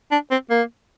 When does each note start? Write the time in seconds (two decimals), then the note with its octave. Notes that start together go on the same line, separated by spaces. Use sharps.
0.12 D4
0.31 C4
0.50 A#3